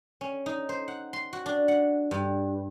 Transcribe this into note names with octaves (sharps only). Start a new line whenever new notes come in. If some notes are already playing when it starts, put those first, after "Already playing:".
C#4
D#4
C5
F#5
C6
F#4
D4
F#5
G2